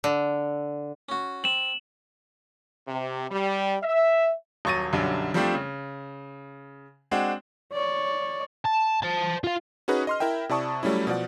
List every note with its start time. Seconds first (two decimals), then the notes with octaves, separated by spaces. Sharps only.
0.04 D3
1.09 C#4 F#4
1.44 C4 E7 F#7
2.87 C3
3.30 G3
3.82 E5
4.65 D#1 F#3 C#6 A6 A#6 D#7
4.93 B1 F#2 D3 F#3 G3
5.34 F3 G3 A3 C4 D4 F4
5.54 C#3
7.11 G#3 C4 D4 F#4
7.72 C#5 D5
8.65 A5
9.02 C5 A5
9.44 F4 F5
9.88 C#4 D#4 F#4 G#4 B4
10.07 D#5 C6 F6
10.20 E4 A#4 E5 G5
10.49 C3 E4 D5 A5 C#6 D#6
10.83 F#3 G3 A3 C#4 E4
11.07 B2 F3 D5 F#5